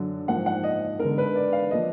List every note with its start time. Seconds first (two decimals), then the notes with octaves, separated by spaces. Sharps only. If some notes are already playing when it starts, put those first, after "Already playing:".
Already playing: F#2 D3 F#3
0.27 G#2 F3 A#3 F#5
0.46 F#5
0.64 D#5
0.99 D3 G#3 B3 A#4
1.18 B4
1.35 D5
1.53 F5
1.71 F3 A#3 D#5